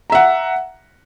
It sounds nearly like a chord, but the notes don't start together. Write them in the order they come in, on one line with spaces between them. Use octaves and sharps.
A#5 E5 F#5